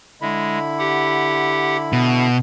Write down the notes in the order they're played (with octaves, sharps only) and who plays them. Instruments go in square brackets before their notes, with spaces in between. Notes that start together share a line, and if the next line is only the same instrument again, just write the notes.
[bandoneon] D3 E4 B5 [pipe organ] G#3
[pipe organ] G4 F#5
[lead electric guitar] B2